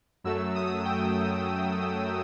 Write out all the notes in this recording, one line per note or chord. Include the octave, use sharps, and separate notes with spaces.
F#2 F#3 A3 E6
D#6
G5